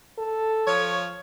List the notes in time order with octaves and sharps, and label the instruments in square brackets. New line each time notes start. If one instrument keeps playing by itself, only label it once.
[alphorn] A4
[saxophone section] F3 C#5